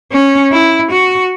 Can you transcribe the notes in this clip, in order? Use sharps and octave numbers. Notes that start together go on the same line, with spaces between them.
C#4
E4
F#4